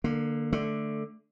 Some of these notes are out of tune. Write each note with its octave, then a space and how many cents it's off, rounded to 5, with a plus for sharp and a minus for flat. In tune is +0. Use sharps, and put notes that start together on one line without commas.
D3 +20 A#3 +0
D3 +5 A3 +0